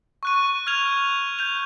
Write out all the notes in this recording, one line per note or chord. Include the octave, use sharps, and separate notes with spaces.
C#6 F#6 D#7
F6 G#6 F7
G6 F7